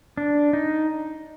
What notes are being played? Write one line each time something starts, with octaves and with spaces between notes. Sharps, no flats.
D4
D#4